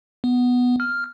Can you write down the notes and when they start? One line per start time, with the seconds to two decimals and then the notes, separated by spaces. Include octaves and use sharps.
0.24 B3
0.80 F6